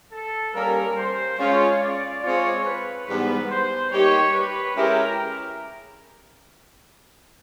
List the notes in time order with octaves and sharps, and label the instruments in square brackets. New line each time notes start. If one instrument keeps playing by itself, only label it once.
[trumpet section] A4
[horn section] G3 A#3 C#4 [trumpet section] A#4
[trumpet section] C5
[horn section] G#3 C#4 F4 [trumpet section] C#5
[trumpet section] D5
[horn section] G#3 C4 F4 [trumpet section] C#5
[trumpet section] B4
[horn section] G#2 E3 G3 B3 [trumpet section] B4
[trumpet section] C5
[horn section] G3 A#3 D#4 G4 [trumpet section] C#5
[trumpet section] B4
[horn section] G#3 C#4 E4 G4 [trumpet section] A#4